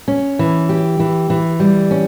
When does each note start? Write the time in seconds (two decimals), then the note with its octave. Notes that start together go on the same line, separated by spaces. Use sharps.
0.08 C#4
0.39 E3
0.69 G4
1.00 E3
1.30 E3
1.60 G3
1.91 C#4